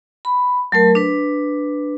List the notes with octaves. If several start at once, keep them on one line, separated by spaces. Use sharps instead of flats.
B5
F#3 A3 A#4
D4 B4